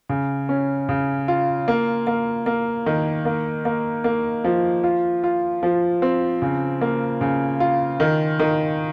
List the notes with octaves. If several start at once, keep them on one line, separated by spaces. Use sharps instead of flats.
C#3
C#4
C#3
F4
A#3
A#3
A#3
D#3
A#3
A#3
A#3
F3
F4
F4
F3
C4
C#3
A#3
C#3
F4
D#3
D#3